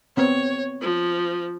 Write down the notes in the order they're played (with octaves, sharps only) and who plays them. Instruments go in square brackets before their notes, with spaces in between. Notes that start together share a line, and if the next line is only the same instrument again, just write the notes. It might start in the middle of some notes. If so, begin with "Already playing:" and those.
[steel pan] B3 C4 [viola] C#5
[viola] F3